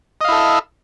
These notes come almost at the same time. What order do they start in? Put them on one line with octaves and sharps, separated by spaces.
D#5 F5 E4 A4